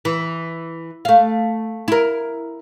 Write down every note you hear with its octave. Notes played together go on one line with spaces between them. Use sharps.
E3
A3 F5
E4 A#4